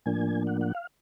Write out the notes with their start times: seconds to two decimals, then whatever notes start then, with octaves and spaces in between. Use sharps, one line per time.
0.06 A2 F3 A#3 D4 G#5
0.47 F#5
0.61 F#5
0.75 F5